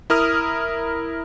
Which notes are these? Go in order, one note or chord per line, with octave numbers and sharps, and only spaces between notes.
E4 A#4 D#6 F6